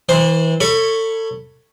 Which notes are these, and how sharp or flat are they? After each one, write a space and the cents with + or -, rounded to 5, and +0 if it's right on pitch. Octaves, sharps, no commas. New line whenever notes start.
E3 -30 C5 +0
A4 +30 C#5 +0 B5 +0